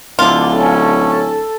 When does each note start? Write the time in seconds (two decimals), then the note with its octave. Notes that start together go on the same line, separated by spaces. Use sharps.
0.19 D1 D3 F4
0.53 C#4 A4